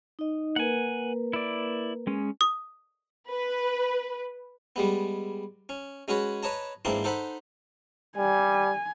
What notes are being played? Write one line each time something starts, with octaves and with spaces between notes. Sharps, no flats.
D#4 D#5
A#3 A#4 B4 F#5 G#5
E4 D5
G#3 C#4
D#6
B4
G3 G#3 B3
C#4
G#3 C#4 F#4 B4 C#5
B4 C#5 D#5 A5 A#5
G#2 E3 A#3 C4 D4 C6
D#4 A4 C5 F#5 B5
G3 G#5